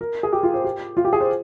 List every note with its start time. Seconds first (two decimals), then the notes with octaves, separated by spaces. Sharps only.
0.01 A#4
0.23 G#4
0.33 G4
0.43 F4
0.54 C5
0.64 G4
0.97 F4
1.05 G4
1.13 G#4
1.21 C5